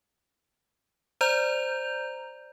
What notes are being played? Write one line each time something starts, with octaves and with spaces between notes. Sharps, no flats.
C5 D5 A#5 G6 F7